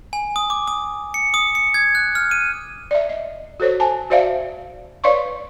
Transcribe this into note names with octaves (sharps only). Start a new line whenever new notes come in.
G#5
D#6
D6
D#6
C#7
D#6
C#7
G#6
F#6
F6
D#7
D5 E5
D#5
F#4 A4 C5 C#5
G#5 A5
F#4 C5 D5 E5 F5
B4 C#5 D5 F5 C6 C#6